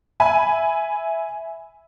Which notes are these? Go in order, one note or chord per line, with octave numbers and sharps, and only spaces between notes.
E5 G#5 B5